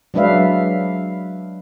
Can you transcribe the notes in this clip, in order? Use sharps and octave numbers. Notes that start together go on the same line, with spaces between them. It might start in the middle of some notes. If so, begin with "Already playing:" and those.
F#3 G#3 D4 B4 E5 F5